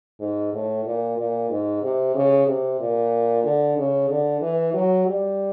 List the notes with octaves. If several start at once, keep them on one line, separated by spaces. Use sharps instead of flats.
G#2
A2
A#2
A#2
G#2
C3
C#3
C3
A#2
D3
C#3
D3
E3
F#3
G3